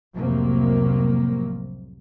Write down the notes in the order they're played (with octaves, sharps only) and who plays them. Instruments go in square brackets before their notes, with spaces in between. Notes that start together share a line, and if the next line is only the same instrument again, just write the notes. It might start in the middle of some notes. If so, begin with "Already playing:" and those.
[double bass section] C2 F2 A2 C3 F#3 A#3